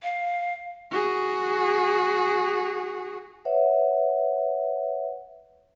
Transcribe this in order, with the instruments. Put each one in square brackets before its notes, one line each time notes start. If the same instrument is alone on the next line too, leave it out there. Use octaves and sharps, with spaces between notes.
[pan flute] F5
[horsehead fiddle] F#4 G#4
[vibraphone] B4 C#5 E5 F#5